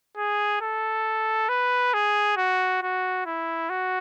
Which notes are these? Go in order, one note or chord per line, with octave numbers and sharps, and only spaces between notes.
G#4
A4
B4
G#4
F#4
F#4
E4
F#4